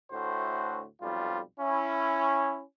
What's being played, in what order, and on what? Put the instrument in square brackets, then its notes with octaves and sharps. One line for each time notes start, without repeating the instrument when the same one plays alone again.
[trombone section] D2 A2 F#4 C5
B1 F2 G3 F4
C#4 E4